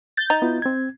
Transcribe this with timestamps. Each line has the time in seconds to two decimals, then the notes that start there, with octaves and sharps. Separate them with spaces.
0.17 G6 A6
0.30 D#4
0.42 B3 E4 F4
0.62 C4 G#6